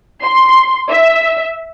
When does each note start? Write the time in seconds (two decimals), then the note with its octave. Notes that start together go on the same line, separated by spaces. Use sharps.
0.22 C6
0.92 E5